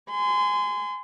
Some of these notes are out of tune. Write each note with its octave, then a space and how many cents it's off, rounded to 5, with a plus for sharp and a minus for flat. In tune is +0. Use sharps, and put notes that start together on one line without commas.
G#5 +0 C6 -35